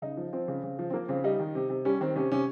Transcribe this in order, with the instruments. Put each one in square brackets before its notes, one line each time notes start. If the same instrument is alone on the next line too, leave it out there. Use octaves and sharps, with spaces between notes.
[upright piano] C#3 D#4
F3
F3 C4
C#3
C#3
F3
C4
F3 A#3
C#3 C4
G3 D#4
D#3
C3
C3
G3 C#4
D#3 C4
C3 C#4
C3 C#4